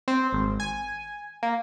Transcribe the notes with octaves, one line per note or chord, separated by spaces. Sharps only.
C4
G#1
G#5
A#3